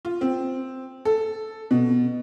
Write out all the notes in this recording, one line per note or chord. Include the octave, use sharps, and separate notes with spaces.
F4
C4
A4
B2